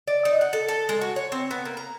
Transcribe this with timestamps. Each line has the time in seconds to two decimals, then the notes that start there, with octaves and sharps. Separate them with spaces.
0.08 D5
0.25 D#4
0.41 F#5
0.53 A4
0.69 A4
0.89 G#3
1.01 F#4
1.16 C#5
1.32 C4
1.51 B3
1.65 A#3
1.77 A#5